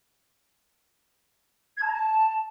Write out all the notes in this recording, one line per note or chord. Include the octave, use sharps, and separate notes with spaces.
G#6
A5
A#5
A5